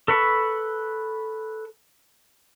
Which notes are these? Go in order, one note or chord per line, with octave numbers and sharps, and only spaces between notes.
A4 B4 B5 C#6